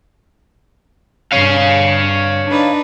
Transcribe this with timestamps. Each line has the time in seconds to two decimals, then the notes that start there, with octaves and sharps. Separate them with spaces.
1.32 G2 C#5 F5
2.49 D4 D#4 B4